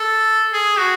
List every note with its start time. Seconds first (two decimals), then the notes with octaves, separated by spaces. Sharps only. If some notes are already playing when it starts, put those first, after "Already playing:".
Already playing: A4
0.53 G#4
0.78 F#4